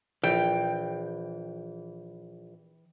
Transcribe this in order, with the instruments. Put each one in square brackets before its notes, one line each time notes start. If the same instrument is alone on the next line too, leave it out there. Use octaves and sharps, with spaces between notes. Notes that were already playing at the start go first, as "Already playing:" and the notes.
[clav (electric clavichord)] A#1 [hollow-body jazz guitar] E3 [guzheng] G5